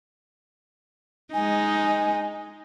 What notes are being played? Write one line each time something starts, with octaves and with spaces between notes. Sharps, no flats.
G#3 D#4 G#5